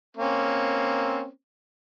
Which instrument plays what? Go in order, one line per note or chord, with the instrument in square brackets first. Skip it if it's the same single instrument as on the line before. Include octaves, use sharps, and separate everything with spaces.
[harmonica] A#3 C4 C#4